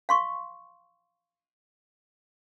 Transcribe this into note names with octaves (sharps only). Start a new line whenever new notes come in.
F5 C6 C#6